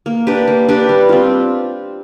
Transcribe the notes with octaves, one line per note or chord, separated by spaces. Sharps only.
A#3
D4 G4 B4
A#3
D4 G4 B4
G3
C4 F4